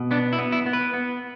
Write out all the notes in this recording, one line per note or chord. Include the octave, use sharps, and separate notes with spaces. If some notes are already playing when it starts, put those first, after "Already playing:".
Already playing: B2
B3 D4
E4
B3
E4
B3
B4
B3